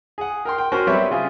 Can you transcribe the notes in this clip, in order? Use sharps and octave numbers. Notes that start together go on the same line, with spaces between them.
G#4 F#5
A#4 G5 C6
G5
C#4 F#4 A#4 C5
G3 B3 C4 C#5 E5
C#3 F4 G#4